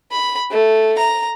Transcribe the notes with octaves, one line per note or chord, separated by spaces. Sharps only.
B5
A3
A#5